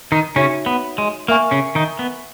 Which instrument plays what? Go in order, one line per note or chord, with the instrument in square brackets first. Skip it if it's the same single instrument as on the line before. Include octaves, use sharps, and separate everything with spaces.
[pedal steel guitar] D#3 D#4
[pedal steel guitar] C#3 C#4 [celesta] D#4 F#4 C#5 E5
[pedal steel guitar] B3
G#3
[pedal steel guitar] A#3 [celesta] A#4 E5 G#5 C#6
[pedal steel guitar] C#3 C#4
D#3 D#4
B3